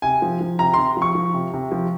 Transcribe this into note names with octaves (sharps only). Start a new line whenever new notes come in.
C3 G#5
F3
F3
C3 A#5
C3 C6
F3
C#6
F3
C3
C3
F3